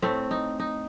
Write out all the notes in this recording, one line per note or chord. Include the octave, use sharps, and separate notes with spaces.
A2 A3 C4
D#4
D#4